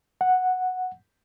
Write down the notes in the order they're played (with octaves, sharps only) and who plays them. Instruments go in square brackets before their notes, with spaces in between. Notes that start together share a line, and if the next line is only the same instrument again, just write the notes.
[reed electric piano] F#5